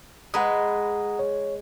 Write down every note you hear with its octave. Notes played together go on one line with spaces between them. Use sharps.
G#3 B4 F#5 A#5 D#6
C#5